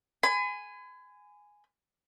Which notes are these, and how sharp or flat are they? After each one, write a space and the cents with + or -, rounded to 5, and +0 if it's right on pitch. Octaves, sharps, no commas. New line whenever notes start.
G#5 +0 B5 +40